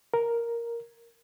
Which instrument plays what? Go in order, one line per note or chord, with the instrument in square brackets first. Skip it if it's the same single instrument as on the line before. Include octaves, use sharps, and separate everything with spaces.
[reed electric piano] A#4